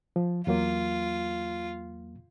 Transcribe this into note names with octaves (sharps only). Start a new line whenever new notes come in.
F3
E2 F#3 A#3 F4